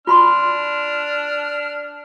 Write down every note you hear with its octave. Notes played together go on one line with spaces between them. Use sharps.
D4 F4 B5 C6 F6